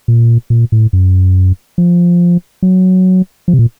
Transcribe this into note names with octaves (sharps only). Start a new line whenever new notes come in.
A#2
A#2
A2
F#2
F3
F#3
F3
C3
A#2